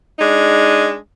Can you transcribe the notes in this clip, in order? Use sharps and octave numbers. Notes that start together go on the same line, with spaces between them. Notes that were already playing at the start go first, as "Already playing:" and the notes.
G#3 D4 D#4